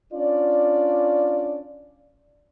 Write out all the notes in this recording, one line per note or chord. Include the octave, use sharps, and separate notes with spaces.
C#4 D4 F4 D5